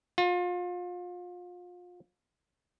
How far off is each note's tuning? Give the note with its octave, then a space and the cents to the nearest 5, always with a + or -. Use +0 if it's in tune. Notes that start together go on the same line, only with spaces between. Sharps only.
F4 +30